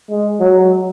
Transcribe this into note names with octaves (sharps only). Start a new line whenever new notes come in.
G#3
F#3